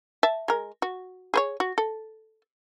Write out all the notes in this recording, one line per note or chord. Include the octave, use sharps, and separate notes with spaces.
E5 A5
G#3 A#4
F#4
G#4 C5 C#5
F#4
A4